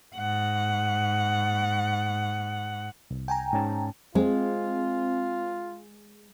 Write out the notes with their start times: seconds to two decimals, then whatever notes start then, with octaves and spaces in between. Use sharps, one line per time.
0.16 G#2 F#5
3.11 C2
3.28 G5 G#5 A#5
3.53 G#2 C#4 A5
4.15 G#3 C4 F4